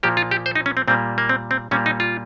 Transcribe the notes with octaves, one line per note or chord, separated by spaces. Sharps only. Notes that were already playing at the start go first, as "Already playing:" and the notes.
A#2 F3 A#3 G4
F4
G4
C5
D#4
C#4
C4
A#2 G3 A#3 C4
A#3
C4
C4
A#2 G3 A#3 C#4
D#4
F4